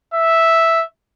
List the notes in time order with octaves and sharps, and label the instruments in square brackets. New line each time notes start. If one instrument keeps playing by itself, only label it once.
[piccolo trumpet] E5